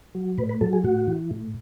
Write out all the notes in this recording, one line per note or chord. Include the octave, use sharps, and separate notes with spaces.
F#3
A2 B4
B4
F#3 A4
G#4
A2 F#4
E3
A2